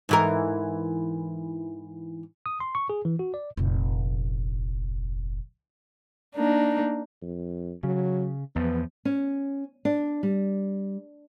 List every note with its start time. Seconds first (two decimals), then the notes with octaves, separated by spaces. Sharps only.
0.09 G#2 E3 A#4
2.46 D#6
2.60 C6
2.75 C#6
2.89 G#4
3.05 E3
3.19 F#4
3.34 D5
3.57 F1 A#1
6.36 A#3 D4 D#4
7.22 F2
7.83 C#3 F#3
8.56 E2 F3 B3
9.05 C#4
9.85 D4
10.23 G3